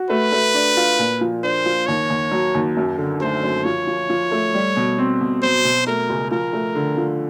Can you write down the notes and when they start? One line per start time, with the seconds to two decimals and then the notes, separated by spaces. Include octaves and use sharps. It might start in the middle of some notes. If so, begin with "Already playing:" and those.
Already playing: F#4
0.10 A3 B4
0.32 A3
0.54 D4
0.77 F4
0.99 A#2
1.21 F3
1.43 D4 C5
1.66 F3
1.87 D#2 C#5
2.10 D#2
2.31 F#3
2.54 D#2
2.77 F#2
2.98 D3
3.20 A3 C5
3.43 F#2
3.64 F3 C#5
3.87 F3
4.10 F3
4.32 A3
4.54 G3
4.76 B2
4.98 C4
5.21 B2
5.43 F#3 C5
5.64 B2
5.87 A3 A#4
6.09 C#2
6.31 F3 A#4
6.53 A3
6.75 D3
6.97 F3